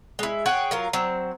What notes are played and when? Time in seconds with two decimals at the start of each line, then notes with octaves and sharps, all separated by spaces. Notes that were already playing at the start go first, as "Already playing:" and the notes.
0.19 G#3 E4
0.46 G#4 C#5 F#5 G5
0.71 F#3 F4 A#4
0.93 F#3 C4